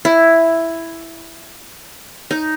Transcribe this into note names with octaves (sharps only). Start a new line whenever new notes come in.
E4
D#4